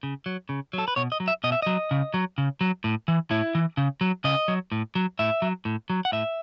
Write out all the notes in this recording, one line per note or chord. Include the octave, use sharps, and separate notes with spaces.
C#3
F#3
C#3
F#3 A4
B4
B2 C#5
D#5
F#3
E5
B2 D#5
E5
F#3 D#5
C#3
F#3
C#3
F#3
A2
E3
A2 E4
E3
C#3
F#3
C#3 D#5
F#3
A2
F#3
A2 E5
F#3
A2
F#3
F#5
A2 E5